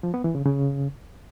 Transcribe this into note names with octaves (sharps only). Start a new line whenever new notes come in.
F3
B3
E3
C#3
C#3